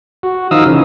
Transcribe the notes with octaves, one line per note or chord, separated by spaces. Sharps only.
F#4
D#3 F3 D#4 F5 D#6 E6
C#3 E3